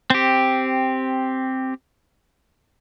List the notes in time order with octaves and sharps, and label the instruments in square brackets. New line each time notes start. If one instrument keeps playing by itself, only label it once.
[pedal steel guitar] C4 G4